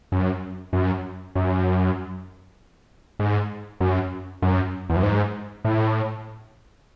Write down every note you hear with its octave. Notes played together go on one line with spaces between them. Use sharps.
F#2
F#2
F#2
G#2
F#2
F#2
E2
F#2
G#2
A2